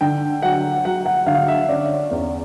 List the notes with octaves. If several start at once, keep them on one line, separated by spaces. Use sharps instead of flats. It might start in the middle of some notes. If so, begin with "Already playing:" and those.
D3 G5
F#3 F#5
F#3 F#5
F#5
D3 F5
E5
C#4 D5
E2